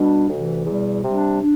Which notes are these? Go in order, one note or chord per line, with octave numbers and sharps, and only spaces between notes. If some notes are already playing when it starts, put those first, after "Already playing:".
Already playing: B2 G3 D4
D2 C3 E3
E2 B2 G3
C3 G3 D4
D4